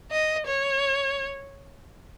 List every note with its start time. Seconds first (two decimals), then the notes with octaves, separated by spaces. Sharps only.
0.11 D#5
0.46 C#5